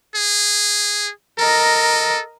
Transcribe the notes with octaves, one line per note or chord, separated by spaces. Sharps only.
G#4
A4 A#4 D#5